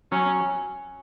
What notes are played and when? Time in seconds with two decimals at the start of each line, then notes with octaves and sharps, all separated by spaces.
0.12 F#3 C#4